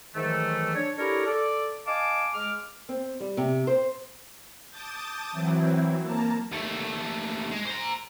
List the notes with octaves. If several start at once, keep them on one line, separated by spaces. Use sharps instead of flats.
G#2 D#3 E3 F#3 A3
D4 C#5
D4 E4 G4 A4 A#4 C#5
A4 D5
D#5 F5 G#5 A5 D6
G#3 D6 F6
C4
G3
C3
C5
A5 D6 D#6 G6 A6
E3 F#3 C4 E4
A#3 A5 A#5
D#2 A3
G#3
C5 A#5